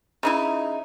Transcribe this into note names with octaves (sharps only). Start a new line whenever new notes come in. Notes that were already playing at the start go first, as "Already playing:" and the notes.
C#3 D#4 E4